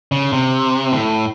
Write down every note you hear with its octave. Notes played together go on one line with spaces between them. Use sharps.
C#3
C3
A2